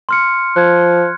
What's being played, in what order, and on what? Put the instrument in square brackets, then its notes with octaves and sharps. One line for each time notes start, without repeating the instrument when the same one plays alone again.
[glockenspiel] C6 F6 C#7
[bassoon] F3 [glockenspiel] F#6 G#6